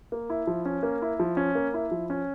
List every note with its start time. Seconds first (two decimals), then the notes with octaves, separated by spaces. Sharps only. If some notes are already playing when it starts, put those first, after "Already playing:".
0.12 A#3
0.30 E4
0.47 F3
0.65 C#4
0.83 A#3
1.02 E4
1.20 F3
1.37 C#4
1.55 A#3
1.74 E4
1.91 F3
2.10 C#4